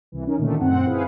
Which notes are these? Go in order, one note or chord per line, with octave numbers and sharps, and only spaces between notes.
C2 E3
C#4 D#4 A#4
A#2 D3 D#3 A3 A#3
F#2 C4 F#5
E4 G#4 B4 C5 F5